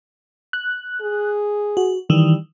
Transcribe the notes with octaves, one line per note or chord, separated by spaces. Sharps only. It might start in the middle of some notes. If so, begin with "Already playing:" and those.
F#6
G#4
F#4
D#3 E3 G3